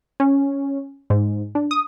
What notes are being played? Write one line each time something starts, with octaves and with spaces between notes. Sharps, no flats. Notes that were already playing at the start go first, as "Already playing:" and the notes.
C#4
G#2
D4
D#6